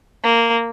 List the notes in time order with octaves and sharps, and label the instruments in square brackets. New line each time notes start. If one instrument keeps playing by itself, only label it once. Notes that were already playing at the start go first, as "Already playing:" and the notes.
[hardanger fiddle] A#3